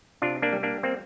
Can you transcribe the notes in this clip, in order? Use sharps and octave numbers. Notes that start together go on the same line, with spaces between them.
C3 D4 F4
A#3 D4
G3
A#3 D4
A#3 C4